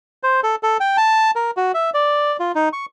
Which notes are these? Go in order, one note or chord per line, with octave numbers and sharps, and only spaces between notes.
C5
A4
A4
G5
A5
A#4
F#4
E5
D5
F4
D#4
C#6